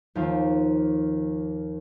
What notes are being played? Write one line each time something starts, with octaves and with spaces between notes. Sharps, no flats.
D#2 F3 F5